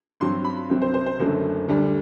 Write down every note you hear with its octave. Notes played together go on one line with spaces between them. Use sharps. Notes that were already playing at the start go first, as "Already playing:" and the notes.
G2 F#3 C4 C6
B5
C2 C3 F#3 C4
C5
C5
C5
F#1 F#2 D3 F#3 A3
D2 D3 G3 D4